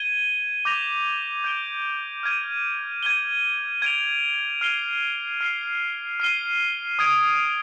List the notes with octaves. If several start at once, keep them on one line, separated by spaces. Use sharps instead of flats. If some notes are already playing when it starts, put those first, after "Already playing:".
Already playing: G#6 D#7 G7
D6 G6 A#6 F7
G6 D7 G7
F6 G#6 D#7
G#6 D#7 G7
G#6 D7 F7
F6 C7 D#7 G7
F6 C7 G7
F6 C7 D#7 G7
D#6 G#6 D7